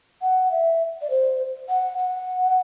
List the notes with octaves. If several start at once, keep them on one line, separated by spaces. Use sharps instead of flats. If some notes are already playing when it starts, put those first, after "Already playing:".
F#5
E5
D5
C5
F#5
F#5